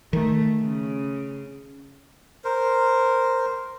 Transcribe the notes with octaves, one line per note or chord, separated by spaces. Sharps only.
D#3 A3
C#3
A#4 C5